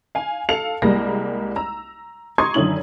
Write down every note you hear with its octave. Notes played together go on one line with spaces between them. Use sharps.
F5 G#5
A4 F5 C#7 F7
C2 G3 G#3 A#3 A#6
A#5 E6
A#5 C6 C#6 D#6 G#6
F#2 D3 D#3 C#4 E4 F#7